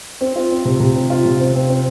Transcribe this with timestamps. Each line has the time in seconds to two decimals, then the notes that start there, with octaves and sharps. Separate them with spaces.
0.21 C4
0.36 F4
0.51 C4
0.65 C3
0.80 C3
0.95 C4
1.10 F4
1.25 C3
1.40 C4
1.55 C4
1.70 C4